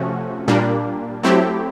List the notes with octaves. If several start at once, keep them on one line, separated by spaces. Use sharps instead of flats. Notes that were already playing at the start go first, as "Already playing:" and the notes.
Already playing: C3 F3 A3 C#4 F#4
A#2 G3 A#3 D4
F#3 A3 C4 E4 G4